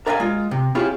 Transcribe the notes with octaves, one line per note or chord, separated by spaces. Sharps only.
A#4 D5 E5 F5 G5 G#5
G#3 F4
C3
C4 E4 F4 G4 G#4 C#5